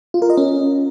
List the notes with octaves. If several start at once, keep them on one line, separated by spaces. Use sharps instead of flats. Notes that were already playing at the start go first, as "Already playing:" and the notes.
F4
A#4
D#5
C#4